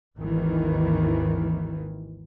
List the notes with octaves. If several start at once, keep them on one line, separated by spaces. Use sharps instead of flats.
G#1 D#2 D#3 E3